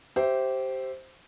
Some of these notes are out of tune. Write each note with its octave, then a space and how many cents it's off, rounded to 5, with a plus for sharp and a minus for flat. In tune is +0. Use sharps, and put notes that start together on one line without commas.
G4 -15 C5 +0 E5 +0